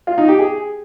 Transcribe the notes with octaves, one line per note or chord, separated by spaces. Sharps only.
F4
D#4
G4
G#4